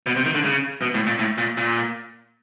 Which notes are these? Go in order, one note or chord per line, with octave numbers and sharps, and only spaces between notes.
B2
C3
D#3
D3
C#3
B2
A2
A#2
A2
A#2
A#2